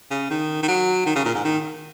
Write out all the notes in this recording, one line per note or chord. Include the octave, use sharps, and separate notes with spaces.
C#3
D#3
D#3
F#3
D#3
C#3
A#2
G#2
D#3